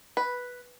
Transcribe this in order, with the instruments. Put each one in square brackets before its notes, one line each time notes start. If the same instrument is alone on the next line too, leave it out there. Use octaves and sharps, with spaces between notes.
[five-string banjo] B4